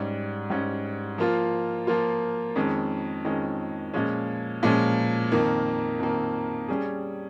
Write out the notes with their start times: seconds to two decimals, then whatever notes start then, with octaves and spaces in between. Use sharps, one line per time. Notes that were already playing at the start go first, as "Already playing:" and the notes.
Already playing: G#2 G3 C#4
0.50 G#2 G3 C#4
1.18 F3 A#3 F4
1.87 F3 A#3 F4
2.55 F2 D#3 G#3 C#4
3.25 F2 D#3 G#3 C#4
3.94 A#2 F3 G#3 C#4
4.63 A#2 F3 G#3 C#4
5.32 F2 D#3 A#3
5.99 F2 D#3 A#3
6.68 G3 C#4 G#4